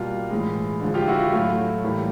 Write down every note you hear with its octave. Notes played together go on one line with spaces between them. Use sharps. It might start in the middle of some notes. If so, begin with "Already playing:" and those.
Already playing: B2 G3 A#3 F4
A2 E3 G#3
D3 F3 G#3
F4 G4
E4 F#4
F4
A2 F#3 A3 F4
A2 E3 G3 A#3